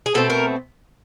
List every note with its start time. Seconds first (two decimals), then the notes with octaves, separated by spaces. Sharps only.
0.06 G#4
0.14 B2 F#3 A3 C4 A4
0.30 A#4